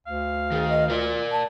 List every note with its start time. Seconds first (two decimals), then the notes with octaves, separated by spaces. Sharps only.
0.07 D2 F5
0.52 D#3 G#4
0.69 D#5
0.90 F4 A#4 D5
1.32 A5